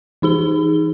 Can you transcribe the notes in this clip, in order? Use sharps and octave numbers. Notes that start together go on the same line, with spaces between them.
E3 D#4 G#4 G7